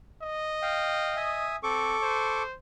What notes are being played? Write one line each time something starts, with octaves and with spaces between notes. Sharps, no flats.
D#5
F5 G5
E5 G#5 D#6
C4 A4 C#6 D6
C5